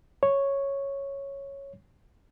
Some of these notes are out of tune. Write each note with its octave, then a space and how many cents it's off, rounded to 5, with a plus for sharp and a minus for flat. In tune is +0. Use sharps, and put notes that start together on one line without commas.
C#5 -5